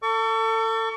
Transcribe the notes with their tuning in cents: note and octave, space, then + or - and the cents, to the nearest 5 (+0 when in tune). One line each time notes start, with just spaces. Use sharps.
A4 +30 C#6 +35